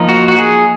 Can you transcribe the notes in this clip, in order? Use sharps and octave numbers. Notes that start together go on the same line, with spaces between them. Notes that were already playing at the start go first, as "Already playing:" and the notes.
Already playing: F3 A#3 D#4
F#4
F#4
G#4